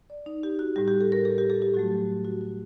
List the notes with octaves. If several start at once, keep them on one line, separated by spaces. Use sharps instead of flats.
D5
D#4
G4
F#4
A2 G3 G4
G4
A4
A#4
A4
G4
A4
G4
A2 F#3 A3 F#4
F#4
F#4